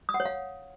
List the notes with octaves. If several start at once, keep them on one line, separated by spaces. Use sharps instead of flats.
D#6
F#5
C#5
F5